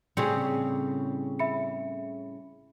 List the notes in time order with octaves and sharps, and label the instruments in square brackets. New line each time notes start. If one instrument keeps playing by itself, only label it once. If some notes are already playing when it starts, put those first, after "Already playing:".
[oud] A2 C#3 G3 [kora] C4 G#4 [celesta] C#7
[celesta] E5 B5 C#7